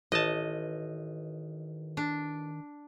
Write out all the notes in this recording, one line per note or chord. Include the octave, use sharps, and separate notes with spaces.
A1 D#3 D#5 A5
D4